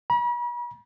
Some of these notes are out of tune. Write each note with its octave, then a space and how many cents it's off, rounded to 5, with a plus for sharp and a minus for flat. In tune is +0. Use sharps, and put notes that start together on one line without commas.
B5 -45